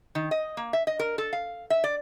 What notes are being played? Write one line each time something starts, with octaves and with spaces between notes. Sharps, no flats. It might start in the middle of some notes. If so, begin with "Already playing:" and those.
D#3
D#5
A#3
E5
D#5
A#4
A4
F5
E5
D5